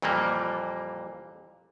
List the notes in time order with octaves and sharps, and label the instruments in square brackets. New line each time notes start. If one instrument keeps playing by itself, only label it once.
[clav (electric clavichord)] F2 A#2 E3 G3 A#3